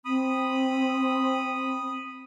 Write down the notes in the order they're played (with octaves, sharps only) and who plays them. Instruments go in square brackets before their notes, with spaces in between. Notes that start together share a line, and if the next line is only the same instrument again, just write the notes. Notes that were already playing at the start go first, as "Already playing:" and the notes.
[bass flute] C4 [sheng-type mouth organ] B5 D#6